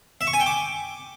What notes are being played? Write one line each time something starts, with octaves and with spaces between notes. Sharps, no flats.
E5
C#6
G#5
G5
D6